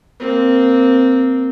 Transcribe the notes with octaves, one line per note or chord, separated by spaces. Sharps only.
A#3 C4